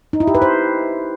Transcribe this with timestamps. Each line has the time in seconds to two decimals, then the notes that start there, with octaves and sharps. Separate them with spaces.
0.13 D#4
0.20 E4
0.27 G4
0.35 B4
0.42 C5